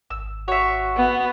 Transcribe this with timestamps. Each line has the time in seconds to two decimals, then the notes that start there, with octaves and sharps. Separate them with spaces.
0.10 G#1 E6
0.48 F#4 C#5 E5
0.97 B3